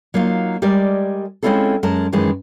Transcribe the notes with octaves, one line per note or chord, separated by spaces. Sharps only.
F#3 A#3 D#4 F4
G3 G#3 A#4 D5
G#3 C4 C#4 E4 F4 A4
F#2 G#3 A#4 A5
F#2 D#3 E3 G#3